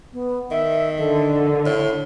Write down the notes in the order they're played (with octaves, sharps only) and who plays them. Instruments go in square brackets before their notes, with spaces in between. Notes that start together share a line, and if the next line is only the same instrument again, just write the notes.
[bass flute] B3
[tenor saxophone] D#3 [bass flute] E5
[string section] D3 [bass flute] A4
[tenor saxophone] A2